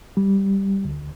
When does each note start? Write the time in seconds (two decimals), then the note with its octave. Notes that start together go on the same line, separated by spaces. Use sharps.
0.17 G3
0.85 D2